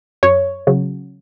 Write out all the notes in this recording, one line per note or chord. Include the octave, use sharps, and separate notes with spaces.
F#2 C#5
C#3 F#3